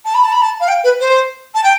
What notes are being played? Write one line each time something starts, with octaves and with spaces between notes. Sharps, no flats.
A5
B5
A5
B5
A5
F5
G5
B4
C5
A5
G5